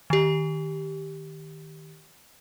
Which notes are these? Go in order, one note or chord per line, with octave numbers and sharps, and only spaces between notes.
D#3 G4